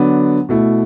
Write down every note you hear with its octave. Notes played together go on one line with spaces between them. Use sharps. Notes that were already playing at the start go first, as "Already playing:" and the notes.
Already playing: D3 F#3 B3 D4
B2 A3 E4